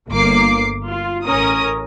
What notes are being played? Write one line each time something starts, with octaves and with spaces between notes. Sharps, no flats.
G1 A#3 D6 C7
F4
A1 C#4 A#4 D#6